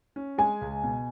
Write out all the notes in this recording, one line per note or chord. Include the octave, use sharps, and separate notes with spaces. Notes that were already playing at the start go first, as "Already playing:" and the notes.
C#4
G#3 G#5
C#2
B2